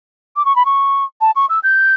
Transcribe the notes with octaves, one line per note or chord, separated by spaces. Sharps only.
D6
C#6
B5
C#6
A5
C#6
E6
G6